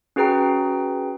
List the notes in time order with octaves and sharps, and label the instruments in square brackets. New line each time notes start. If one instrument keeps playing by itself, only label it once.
[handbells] C#4 F#4 G#4 B4 G5 A#5